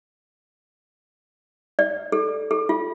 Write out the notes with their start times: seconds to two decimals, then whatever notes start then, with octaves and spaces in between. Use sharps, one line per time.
1.79 D5
2.12 A4
2.51 A4
2.69 F4